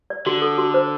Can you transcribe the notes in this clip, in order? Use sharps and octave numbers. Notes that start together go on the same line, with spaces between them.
D5
D3 F#4
A4
F#4
C5